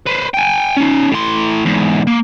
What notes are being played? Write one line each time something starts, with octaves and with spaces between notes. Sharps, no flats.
B4 C5
G5 G#5
C#4 D#4
A2 C6
E2 G#2
A#3